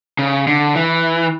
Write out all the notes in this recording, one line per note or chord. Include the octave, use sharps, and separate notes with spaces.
C#3
D3
E3